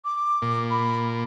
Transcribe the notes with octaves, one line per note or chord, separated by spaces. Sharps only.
D6
A#2
B5